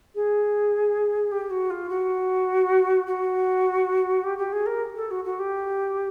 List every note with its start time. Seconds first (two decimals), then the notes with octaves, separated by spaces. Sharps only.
0.15 G#4
1.31 G4
1.50 F#4
1.70 F4
1.89 F#4
3.06 F#4
4.23 G4
4.38 G4
4.52 G#4
4.66 A#4
4.96 A4
5.10 F#4
5.24 F#4
5.39 G4